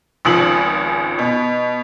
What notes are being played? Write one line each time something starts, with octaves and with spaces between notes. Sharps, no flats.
G#1 C#2 F3 D#6 F#7
B2